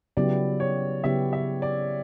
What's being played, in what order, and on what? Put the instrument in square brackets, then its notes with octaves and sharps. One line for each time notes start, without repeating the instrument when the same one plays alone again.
[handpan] C#3 F#3 B3 E4 G4 [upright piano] D5
[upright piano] C#5
[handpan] C#3 F#3 B3 E4 G4 [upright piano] E5
[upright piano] E5
D5